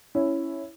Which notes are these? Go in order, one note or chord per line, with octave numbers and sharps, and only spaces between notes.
C#4 E4